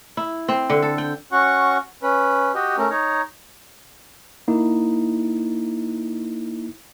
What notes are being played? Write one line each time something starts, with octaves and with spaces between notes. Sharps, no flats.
E4
C4
D3
A4
G5
C#4 F#4 F#5 C#6
C#4 B4
F#4 G4 D#5
A3 C#4 A#4
D#4 C#5 A#5
A#3 D#4 E4